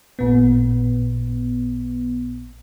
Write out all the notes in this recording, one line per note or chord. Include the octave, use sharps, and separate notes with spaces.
A1 A#2 B3